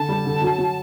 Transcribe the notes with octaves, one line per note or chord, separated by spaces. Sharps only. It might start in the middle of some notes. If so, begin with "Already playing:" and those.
Already playing: D3 A5
G3
D3
F#3
F#3